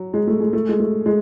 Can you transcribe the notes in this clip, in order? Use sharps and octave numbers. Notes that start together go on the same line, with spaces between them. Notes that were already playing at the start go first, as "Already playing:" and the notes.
Already playing: F#3
G#3
A3
G#3
A3
G#3
A3
G#3